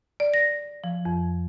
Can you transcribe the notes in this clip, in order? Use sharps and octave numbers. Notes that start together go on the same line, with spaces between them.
D5
A#6
F3
F2